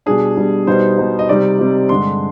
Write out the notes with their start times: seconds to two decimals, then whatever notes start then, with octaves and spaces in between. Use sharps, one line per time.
0.06 B2 G3 D4 G#4
0.37 B2 G3 D4
0.67 B2 G3 B3 D#4 C5
0.98 B2 G3 B3 D#4
1.19 D#5
1.28 C3 G3 C4 D#4 D5
1.59 C3 G3 C4 D#4
1.89 G2 D3 G#3 C6